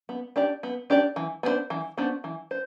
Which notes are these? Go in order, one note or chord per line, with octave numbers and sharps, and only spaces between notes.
B3
D4 G4 D5
B3
D4 G4 D5
E3
B3 D4 F#4 C5
E3
B3 D4 F#4 C5
E3
C5